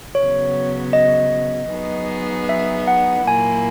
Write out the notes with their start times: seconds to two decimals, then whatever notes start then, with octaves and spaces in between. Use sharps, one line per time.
0.15 C#3 F#3 B3 C#5
0.93 D#5
1.71 F#3 B3 D#4 G#4
2.49 E5
2.88 F#5
3.26 A#2 F#3 A#3 E4 G#5